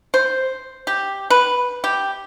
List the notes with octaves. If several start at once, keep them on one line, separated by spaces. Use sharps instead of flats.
C5
G4
B4
G4